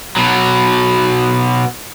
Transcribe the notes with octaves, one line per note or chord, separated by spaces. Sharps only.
B2 F#3